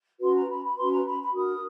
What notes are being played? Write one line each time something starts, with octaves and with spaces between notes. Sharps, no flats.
C#4 F#4 B4 C6
A#5
B5
B5
C#4 F#4 B4 C6
A#5
B5
B5
D4 F#4 A#4 D#6